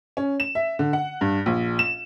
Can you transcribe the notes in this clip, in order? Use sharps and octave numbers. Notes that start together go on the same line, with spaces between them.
C#4
E7
E5
D3
F#5
G2
A#1
E7